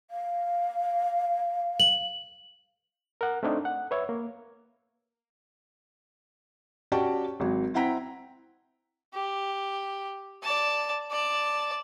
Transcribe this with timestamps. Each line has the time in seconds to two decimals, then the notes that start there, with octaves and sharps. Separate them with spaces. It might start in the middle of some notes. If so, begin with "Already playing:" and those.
0.11 F5
1.80 F#7
3.21 A#4 F#5
3.43 A3 C4 D4 D#4
3.65 F#5
3.91 B4 C#5 E5
4.09 A#3
6.92 C#4 F#4 G4 D5 G5 A5
7.40 G#1 F#3
7.74 C4 E4 F#5 G5 A#5 B6
9.14 G4
10.43 D5 A5
11.11 D5 A5